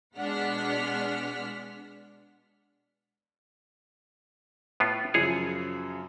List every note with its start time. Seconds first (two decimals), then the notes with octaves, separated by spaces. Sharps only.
0.16 B2 G#3 D4 F#5 F6 B6
4.80 A2 B3 F4
5.14 F#2 C#3 F3 G#4 C#5